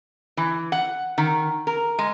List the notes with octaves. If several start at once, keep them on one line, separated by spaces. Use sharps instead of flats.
E3
F#5
D#3
A#4
G#3